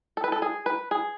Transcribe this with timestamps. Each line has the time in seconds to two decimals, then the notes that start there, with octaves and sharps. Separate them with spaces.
0.17 A4
0.24 B4
0.32 A4
0.42 G#4
0.66 B4
0.91 G#4